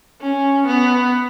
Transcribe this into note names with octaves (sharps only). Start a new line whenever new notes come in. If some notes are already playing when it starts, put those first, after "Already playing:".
C#4
B3